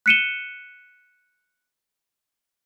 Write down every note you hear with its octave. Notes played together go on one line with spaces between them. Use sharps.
F#6 B6 C#7 D#7 E7 G7